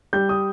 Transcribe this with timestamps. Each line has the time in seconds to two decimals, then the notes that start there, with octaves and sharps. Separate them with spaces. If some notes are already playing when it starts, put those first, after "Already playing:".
0.13 G3 G6
0.29 D#6